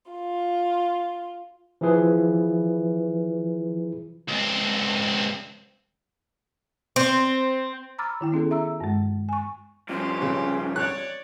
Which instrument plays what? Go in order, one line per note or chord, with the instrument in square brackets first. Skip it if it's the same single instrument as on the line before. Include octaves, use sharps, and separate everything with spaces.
[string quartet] F4
[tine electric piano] E3 F3 E4 G#4 B4
[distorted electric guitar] C#2 C4
[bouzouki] C4
[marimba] A#5 B5 D6 E6 F6 A6
D#3 E4 G5
B3 C#4 G#4 A4
E5 A#5 E6
G2 G#3
G#5 C#6
[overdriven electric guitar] G2 F3 [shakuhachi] C#4 [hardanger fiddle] G4 C6
[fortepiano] C#3
[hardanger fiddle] C#5 D5 [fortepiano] F#6